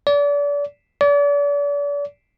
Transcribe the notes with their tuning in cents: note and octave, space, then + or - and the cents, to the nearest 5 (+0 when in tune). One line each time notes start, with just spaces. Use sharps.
D5 -35
D5 -40